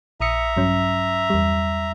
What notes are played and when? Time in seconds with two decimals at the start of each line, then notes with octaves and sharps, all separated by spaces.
0.20 A#1 E5 A#5 D#6 C#7
0.57 G2 F#3 C#4
1.30 E2 G3